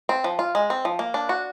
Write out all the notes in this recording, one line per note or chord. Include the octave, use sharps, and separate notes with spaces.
C4
F3
F4
G#3
C4
F3
A#3
D4
F#4